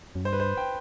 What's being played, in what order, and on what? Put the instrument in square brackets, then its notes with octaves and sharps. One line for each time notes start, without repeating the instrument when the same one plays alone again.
[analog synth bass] F#2
[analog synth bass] G2 [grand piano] C5
[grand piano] B4
C5
G5